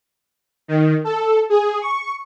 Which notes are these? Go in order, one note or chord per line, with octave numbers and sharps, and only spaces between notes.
D#3
A4
G#4
C#6